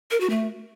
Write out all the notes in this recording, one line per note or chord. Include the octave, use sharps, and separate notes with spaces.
A#4
F#4
A3